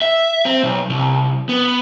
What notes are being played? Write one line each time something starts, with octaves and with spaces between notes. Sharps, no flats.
E5
C4
B1
C2
B3